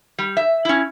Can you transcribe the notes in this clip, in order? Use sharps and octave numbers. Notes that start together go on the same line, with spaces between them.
G3
E5
C#4 E4